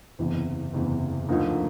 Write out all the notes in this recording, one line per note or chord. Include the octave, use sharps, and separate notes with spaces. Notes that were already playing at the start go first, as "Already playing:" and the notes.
F#1 E2 C3 E3
F#1 E2 C3 E3
D2 D3 F3 A#3 D#4